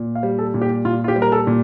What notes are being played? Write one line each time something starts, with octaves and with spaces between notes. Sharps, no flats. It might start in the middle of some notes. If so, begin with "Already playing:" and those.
Already playing: A#2
F5
G3
A4
A#2
G4
A#2 F4
F4
G4
G3
A#4
A4
A#2